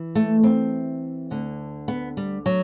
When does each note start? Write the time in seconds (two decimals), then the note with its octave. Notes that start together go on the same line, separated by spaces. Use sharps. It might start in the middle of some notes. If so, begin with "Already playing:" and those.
Already playing: E3
0.15 A3
0.43 C4
1.31 D2 D3
1.88 B3
2.17 G3
2.46 F#3